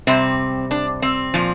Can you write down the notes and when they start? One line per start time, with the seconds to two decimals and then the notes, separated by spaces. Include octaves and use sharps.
0.07 C3 G3 C4
0.71 D4
1.02 C4
1.34 A#2 F3